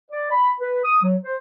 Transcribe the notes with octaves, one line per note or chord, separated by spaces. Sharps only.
D5
B5
B4
D#6
F#3
C5